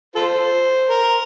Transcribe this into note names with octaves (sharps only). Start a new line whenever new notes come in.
F4 A4 C5
A#4